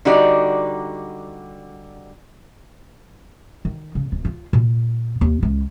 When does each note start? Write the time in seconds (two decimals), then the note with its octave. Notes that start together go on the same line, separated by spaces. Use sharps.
0.05 D3 G3 D#4 F#4 G4 D5
3.65 D#3
3.95 C#3
4.12 D1
4.25 F4
4.53 A#2
5.21 D#2
5.43 C#2